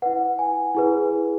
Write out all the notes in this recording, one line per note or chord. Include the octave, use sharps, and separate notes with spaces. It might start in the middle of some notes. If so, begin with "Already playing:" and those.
E4 B4 F#5
G#5
E4 G#4 B4